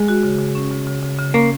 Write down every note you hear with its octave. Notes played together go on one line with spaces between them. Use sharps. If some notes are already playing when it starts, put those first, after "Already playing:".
Already playing: G#3
F#4
C#3
C#3
C#4
C#3
C#3
C#3
C#3
A#3 C#4